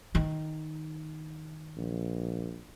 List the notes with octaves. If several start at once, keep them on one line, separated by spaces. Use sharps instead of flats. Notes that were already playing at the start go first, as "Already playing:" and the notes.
D#3
A#1